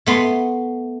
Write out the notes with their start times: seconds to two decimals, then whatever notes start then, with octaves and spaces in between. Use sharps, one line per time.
0.06 A3 B3 C6